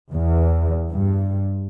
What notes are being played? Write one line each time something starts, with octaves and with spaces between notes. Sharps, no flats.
E2
G2